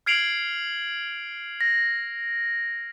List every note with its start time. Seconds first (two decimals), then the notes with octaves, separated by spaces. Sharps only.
0.06 F6 G#6 C7 D7 F7 F#7
1.61 A#6